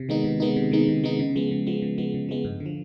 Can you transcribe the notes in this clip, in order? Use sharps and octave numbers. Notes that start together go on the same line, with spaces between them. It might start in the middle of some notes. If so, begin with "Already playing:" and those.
Already playing: C3
D#3 G#3 B3 D#4
C3
D#3 G#3 B3 D#4
C3
D#3 G#3 B3 D#4
C3
D#3 G#3 B3 D#4
C#3
F3 G#3 B3
C#3
F3 G#3 B3
C#3
F3 G#3 B3
C#3
F3 G#3 B3
G2
D3
F3